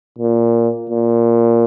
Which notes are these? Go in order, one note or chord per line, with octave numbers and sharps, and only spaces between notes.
A#2
A#2